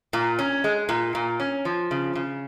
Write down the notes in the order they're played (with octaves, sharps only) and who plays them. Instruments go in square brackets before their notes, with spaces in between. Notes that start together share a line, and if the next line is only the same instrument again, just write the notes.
[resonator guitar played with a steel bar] A#2
C#4
G#3
A#2
A#2
C#4
F3
C#3
C#3